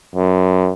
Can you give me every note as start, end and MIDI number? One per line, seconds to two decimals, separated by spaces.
0.15 0.72 42